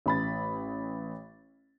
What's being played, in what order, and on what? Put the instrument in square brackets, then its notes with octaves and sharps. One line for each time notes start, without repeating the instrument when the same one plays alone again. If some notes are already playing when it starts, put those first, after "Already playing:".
[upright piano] A1 B5 A6